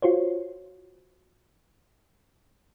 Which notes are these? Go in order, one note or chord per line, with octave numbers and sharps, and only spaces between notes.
F4 F#4 C5 C#5